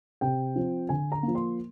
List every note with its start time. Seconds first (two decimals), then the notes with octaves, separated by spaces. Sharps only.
0.21 C3 G5
0.56 F3 C4
0.89 D3 G#5
1.12 A#5
1.23 A#3
1.28 F3
1.35 C6